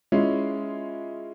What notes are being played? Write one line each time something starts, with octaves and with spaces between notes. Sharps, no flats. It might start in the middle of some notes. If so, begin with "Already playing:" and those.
G#3 C#4 E4 F4